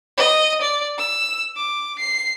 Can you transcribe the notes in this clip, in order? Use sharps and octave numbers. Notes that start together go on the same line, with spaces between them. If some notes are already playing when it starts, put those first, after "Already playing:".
D#5
D5
E6
D6
C7